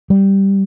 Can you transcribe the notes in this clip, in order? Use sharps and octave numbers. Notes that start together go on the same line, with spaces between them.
G3